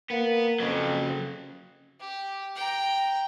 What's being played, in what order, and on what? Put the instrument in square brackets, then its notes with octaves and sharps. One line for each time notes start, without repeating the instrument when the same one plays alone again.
[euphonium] A#3 [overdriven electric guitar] B3
[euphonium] F2 [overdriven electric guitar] C#3 F#3
[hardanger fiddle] G4
G5 A#5